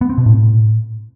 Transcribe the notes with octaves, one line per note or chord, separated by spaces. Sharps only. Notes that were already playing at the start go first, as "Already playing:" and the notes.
B3
C4
B2
A2